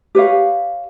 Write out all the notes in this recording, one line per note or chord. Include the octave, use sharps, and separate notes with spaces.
G4 B4 C#5 F5